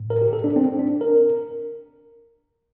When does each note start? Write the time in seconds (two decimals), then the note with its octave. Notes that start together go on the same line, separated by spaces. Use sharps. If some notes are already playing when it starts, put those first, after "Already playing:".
Already playing: A2
0.10 A#4
0.22 G4
0.33 A4
0.44 D4
0.56 C4
0.79 D4
1.01 A#4